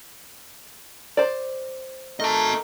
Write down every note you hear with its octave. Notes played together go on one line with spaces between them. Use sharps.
C5 D5
A3 D#4 A#4 D#5 A5